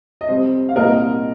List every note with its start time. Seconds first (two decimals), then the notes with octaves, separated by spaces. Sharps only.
0.21 D#5
0.28 F2 C3 G3 C5
0.69 F5
0.76 C2 A#2 G3 A#3 A#4 D#5